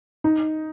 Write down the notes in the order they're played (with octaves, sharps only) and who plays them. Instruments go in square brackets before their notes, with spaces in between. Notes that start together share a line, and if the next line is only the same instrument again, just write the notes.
[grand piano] D#4